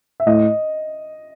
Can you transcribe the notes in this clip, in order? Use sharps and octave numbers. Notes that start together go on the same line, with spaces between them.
E5
A2 D#5